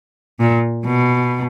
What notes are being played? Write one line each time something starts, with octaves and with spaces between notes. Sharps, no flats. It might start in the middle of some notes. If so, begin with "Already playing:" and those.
A#2
B2